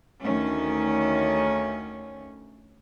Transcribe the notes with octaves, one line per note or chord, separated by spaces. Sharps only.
D2 D#3 A3 C#4